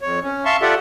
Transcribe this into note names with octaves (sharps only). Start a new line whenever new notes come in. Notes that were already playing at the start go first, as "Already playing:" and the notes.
F2 C#5
C#4
E5 F5 A5 C6 C#6
F4 G4 A4 D5 E5 F#5